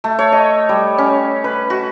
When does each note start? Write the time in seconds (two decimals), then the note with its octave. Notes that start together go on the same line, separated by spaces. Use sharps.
0.04 A3
0.19 C#5
0.32 D#5
0.69 G3
0.98 C#4
1.44 B4
1.70 F#4